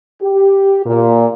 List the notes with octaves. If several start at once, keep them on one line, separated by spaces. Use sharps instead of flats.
G4
A#2